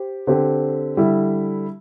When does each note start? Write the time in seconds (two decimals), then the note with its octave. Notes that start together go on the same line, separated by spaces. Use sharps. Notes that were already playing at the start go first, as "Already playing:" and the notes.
Already playing: G4 C5
0.27 D3 C4 G4 C5
0.97 D3 G3 E4